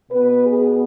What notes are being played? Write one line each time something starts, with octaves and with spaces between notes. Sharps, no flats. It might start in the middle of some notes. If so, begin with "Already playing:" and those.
B2 B3 B4
G#4